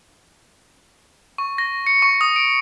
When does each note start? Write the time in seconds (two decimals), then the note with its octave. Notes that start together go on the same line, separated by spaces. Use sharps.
1.38 C#6
1.58 A#6
1.87 C#7
2.02 C#6
2.21 D#6
2.36 D7